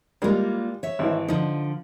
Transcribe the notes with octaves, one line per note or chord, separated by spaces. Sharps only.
G3 G#3 A#3 F4
C#5 E5
G#1 E3
D3 F3 D#4